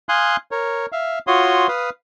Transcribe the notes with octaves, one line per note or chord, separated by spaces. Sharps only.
F5 G#5 C6 D#6 F#6
A#4 C#5
E5 F5
F4 F#4 C#5 C6 D#6
B4 F5 D#6